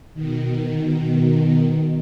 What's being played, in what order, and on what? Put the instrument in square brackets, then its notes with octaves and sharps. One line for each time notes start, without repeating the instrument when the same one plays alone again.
[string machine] B2 D#3